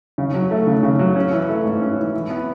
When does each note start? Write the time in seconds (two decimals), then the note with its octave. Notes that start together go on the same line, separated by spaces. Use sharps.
0.18 C#3
0.34 F#3
0.51 A3
0.67 C#3
0.83 C#3
0.99 F#3
1.16 C#4
1.32 E3
1.49 A3
1.65 G#2
1.81 C#4
1.98 E3
2.13 E3
2.30 B3